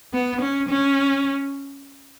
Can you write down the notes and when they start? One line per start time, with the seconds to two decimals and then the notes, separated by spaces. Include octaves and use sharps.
0.14 B3
0.41 C#4
0.69 C#4